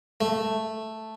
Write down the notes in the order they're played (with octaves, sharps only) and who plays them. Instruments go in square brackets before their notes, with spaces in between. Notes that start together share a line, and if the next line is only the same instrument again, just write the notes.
[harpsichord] A3